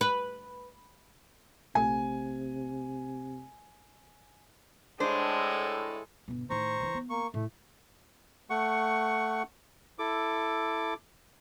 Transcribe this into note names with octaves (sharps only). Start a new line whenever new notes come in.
B4
A#1 C3 A3 G#5
A2 G#3 D4 A4 C5
G1 B2
A2 D#3 C5 A#5 C#6
E3 D4
B3
A#3 C#6
A2 A3
A3 F#5 C#6
E4 A4 D6